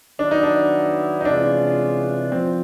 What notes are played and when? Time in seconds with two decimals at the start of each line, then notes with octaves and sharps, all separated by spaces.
0.19 D#3 F#3 B3 D4 E4
0.31 D#4
0.43 D4
1.21 D#4
1.25 C3 E3 G#3 C#4 D4 F4
2.32 F3 C4